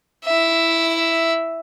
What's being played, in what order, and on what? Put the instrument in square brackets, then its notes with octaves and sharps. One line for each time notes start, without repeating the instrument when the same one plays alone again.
[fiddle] E4 E5